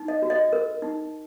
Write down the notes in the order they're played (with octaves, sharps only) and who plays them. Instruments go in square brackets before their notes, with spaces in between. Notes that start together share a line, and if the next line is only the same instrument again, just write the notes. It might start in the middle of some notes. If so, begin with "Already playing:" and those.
Already playing: [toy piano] D#4
D#5
F#4
D#5
A#4
D#4